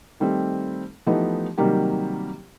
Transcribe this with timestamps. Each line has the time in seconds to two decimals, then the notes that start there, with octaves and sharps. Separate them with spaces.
0.20 D#3 G3 A3 C4
1.06 E3 F3 A3 B3 D#4 G4
1.58 C3 D#3 F#3 G3 A#3 G4